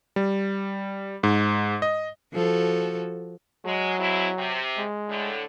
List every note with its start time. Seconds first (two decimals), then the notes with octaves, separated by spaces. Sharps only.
0.16 G3
1.23 G#2
1.82 D#5
2.33 F3 F#4 A4
3.65 F#3 G#3
3.99 G#3 C4 E4
4.37 C3
4.78 G#3
5.08 A2 D3